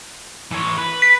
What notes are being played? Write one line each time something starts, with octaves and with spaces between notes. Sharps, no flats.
E3 C#5
B4
B6